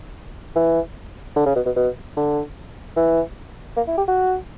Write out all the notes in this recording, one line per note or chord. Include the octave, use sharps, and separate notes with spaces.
E3
D3
C#3
B2
B2
B2
D3
E3
A#3
E4
G4
F#4